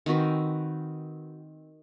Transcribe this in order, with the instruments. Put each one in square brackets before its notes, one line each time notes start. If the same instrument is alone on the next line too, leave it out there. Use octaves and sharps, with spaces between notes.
[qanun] D#3 C4 F#4 B4